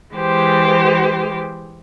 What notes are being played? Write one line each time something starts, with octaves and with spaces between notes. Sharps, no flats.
E3 G#3 G4 C5